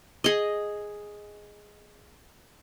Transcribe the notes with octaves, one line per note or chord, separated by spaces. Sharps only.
G#4 D#5